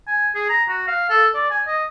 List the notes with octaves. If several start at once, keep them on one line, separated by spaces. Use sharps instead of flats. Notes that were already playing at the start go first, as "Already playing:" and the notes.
G#5
G#4
A#5
F#4
F5
A4
D5
G#5
D#5